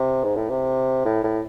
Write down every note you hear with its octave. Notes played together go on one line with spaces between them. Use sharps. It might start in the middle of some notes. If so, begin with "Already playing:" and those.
Already playing: C3
G#2
A2
C3
A2
A2